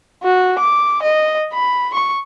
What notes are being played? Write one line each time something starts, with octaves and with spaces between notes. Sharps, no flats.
F#4
D6
D#5
B5
C#6